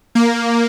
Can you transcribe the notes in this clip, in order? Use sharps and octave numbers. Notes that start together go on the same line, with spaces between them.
A#3